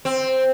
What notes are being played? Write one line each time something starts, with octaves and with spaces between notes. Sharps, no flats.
C4